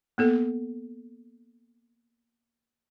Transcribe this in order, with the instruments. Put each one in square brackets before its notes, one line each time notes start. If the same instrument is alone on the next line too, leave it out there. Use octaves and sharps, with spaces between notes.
[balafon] A#3 B3 A4